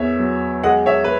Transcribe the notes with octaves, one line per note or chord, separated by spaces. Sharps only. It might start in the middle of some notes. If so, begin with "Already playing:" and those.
Already playing: E2 B3 C#5 E5
F#3
G#3 D#5 F#5
C#5 E5
B4